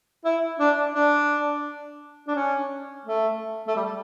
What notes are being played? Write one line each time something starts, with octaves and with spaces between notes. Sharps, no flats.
E4
D4
D4
D4
C#4
A3
A3
G3